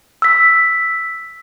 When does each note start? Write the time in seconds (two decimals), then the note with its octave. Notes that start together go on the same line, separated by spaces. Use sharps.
0.22 E6 B6